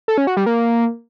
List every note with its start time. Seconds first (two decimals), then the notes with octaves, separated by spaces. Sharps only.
0.08 A4
0.18 C#4
0.27 F#4
0.37 G3
0.46 A#3